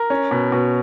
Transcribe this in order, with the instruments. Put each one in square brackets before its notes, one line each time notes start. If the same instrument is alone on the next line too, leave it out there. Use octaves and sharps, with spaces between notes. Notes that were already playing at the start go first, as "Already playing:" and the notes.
Already playing: [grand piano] A#4
C#4
B2
B2